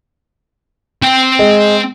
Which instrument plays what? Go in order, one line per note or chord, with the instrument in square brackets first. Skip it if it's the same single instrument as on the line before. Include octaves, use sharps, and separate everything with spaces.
[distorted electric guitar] C4 G5
[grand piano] G#3